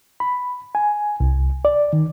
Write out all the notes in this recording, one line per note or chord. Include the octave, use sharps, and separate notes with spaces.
B5
G#5
C2
D5
D#3